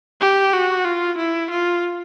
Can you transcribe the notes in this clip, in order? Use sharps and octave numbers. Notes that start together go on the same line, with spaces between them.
G4
F#4
F4
E4
F4